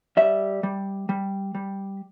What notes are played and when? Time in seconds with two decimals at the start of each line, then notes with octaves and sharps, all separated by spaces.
0.17 G3 E5
0.63 G3
1.09 G3
1.55 G3